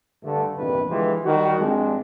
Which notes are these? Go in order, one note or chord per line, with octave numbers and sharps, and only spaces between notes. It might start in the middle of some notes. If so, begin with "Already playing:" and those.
G2 D3 A3
A#1 E2 G2 C3 D#3 B4
D3 E3 F3 G#3 G4 C5
D#3 G3 F#4
G2 F3 G#3 C4 D4